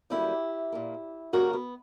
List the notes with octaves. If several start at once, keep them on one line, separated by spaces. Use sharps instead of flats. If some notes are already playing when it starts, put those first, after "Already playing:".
F#2 D3 G3 A#3 E4 G4
A#2 A#3
F#2 C#3 G3 A#3 F#4 A#4
B3